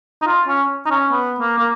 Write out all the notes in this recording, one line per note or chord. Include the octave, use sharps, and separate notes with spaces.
D#4
F4
C#4
D#4
C#4
B3
A#3
A#3